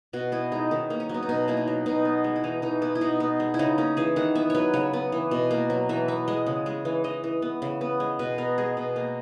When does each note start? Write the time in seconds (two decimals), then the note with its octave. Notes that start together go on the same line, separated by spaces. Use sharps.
0.13 B2 F#4
0.32 B3 E4
0.52 G#3 D#4
0.71 D#3 C#4
0.90 A#3
1.00 C#4
1.09 F#3 B3
1.23 D#4
1.29 B2 C#4
1.48 A#3 E4
1.57 D#4
1.67 F#3
1.86 B2 D#4
2.05 B3
2.24 G#3
2.36 E4
2.44 E3 D#4
2.62 E3 D#4
2.82 B3 E4
2.95 E4
3.01 B2 D#4
3.20 B3
3.40 G#3
3.54 E4
3.59 C#3 D#4
3.78 A#3 C#4
3.97 E3 G#4
4.16 D#3 F#5
4.35 B3 E5
4.50 F#3 B4 C#5
4.74 C#3 C#5
4.93 B3
5.12 E3
5.31 B2
5.51 A#3
5.70 F#3
5.89 E3 E5
6.08 B3 E5
6.28 G#3 D#5
6.47 C#3
6.66 G#3
6.85 E3
7.04 E3 D#5
7.24 E3
7.42 B3
7.62 C#3
7.81 B3
8.00 G#3
8.19 B2 B4
8.38 B3 A#4
8.58 G#3 G#4
8.77 B2
8.96 A#3